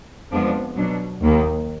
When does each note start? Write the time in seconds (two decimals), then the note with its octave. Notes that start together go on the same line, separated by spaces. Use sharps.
0.31 F2 F3 G#3 B3 D4
0.76 B2 F#3 D4
1.21 D#2 D#3 A#3